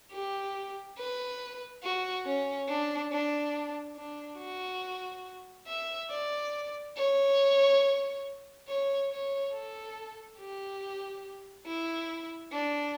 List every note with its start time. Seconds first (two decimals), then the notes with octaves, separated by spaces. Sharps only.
0.12 G4
0.98 B4
1.83 F#4
2.25 C#4
2.69 D4
3.12 D4
3.97 D4
4.39 F#4
5.68 E5
6.10 D5
6.97 C#5
8.68 C#5
9.10 C#5
9.53 A4
10.38 G4
11.67 E4
12.51 D4